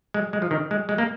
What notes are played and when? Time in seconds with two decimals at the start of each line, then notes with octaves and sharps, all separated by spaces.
0.14 G#3
0.33 G#3
0.42 F3
0.51 D#3
0.71 G#3
0.89 G#3
0.98 A#3